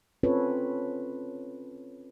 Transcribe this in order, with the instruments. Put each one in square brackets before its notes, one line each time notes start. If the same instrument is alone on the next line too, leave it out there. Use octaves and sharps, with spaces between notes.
[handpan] C4 C#4 F4 A4 B4 C#5